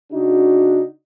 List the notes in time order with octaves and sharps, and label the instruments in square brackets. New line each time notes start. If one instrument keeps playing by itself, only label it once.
[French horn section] C#3 D4 D#4 F#4